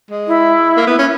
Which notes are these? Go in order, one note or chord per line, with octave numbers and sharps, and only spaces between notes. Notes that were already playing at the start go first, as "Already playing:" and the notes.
G#3
E4
A#3
B3
C#4